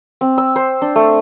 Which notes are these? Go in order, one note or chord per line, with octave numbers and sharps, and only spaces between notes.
C4
E6
C5
D4
A3